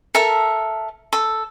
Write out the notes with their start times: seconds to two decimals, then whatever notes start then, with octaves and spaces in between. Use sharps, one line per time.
0.14 A4 A#4 E5 A5
1.13 A4